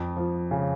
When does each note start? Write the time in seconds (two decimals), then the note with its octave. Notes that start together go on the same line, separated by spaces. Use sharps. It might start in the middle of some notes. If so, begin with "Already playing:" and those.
Already playing: F2
0.17 F3
0.51 C#3